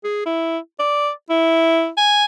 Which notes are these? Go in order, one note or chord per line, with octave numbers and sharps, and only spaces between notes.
G#4
E4
D5
E4
G#5